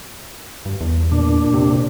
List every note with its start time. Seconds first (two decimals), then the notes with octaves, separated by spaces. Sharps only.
0.65 G2
0.81 E2
1.12 A#2 D4
1.54 C3